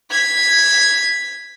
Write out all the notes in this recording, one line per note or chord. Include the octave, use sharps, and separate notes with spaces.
G#6 B6